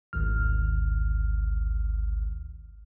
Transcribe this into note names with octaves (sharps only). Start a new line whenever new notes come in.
G#1 D2 F6